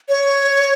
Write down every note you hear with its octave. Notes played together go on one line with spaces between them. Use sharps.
C#5